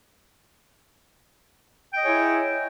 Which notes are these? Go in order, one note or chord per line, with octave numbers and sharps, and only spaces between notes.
E4 G#4 C#5 D#5 G5